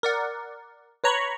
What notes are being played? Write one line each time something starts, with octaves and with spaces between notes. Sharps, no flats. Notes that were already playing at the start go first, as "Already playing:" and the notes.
A#4 D5 F#5
B4 C#5 A#5 B5 C#6